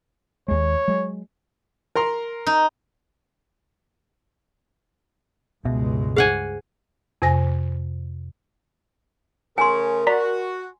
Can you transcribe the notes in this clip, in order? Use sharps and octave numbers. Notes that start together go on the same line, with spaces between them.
D#2 G#3 C#5
F#3 G#3
A#4 A#5 C6
D#4
C#2 G2 B2 G#3 E5
G#4 C5 F5 F#5 G#5
F2 C3 C5 G#5 A#6
C#3 A3 A#4 C#5 G#5 C6
F#4 D5 A#5 B6